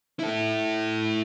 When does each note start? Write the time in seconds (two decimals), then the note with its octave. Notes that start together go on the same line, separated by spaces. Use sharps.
0.19 E4 A4